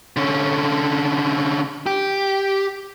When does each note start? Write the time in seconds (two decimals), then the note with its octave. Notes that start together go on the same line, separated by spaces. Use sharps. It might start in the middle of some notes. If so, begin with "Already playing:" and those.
0.17 D3 C#4
1.86 G4